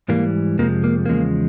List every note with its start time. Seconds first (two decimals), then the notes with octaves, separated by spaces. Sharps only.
0.08 G#2 E3 G3 A#3
0.59 F2 C3 F3 G#3 A#3
0.84 A#3
1.06 E2 C#3 F3 G#3 A#3